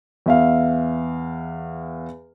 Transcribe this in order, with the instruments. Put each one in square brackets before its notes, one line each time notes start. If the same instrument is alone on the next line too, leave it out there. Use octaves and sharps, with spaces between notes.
[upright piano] E2 E5 F5